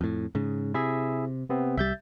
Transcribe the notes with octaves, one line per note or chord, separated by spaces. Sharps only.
F2 A2
G#2 C#3
C3 E4 G#4 E5
C3 B3 C4
C2 G3 E5 G6 A6